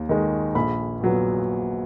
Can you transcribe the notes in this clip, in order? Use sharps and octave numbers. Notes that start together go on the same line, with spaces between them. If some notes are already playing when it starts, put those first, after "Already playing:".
Already playing: D#2
D#3 G#3
A#1 B5
A#2 F#3 B3